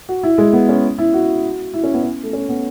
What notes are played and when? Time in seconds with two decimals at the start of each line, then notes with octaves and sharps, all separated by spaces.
0.09 F#4
0.23 E4
0.38 G#3
0.53 B3
0.69 C#4
0.98 E4
1.14 F#4
1.74 E4
1.83 C#4
1.94 B3
2.03 C#4
2.23 A3
2.33 C#4
2.49 B3